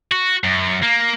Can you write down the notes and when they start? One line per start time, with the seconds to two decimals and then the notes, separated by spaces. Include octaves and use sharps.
0.12 F#4
0.44 F#2
0.83 A#3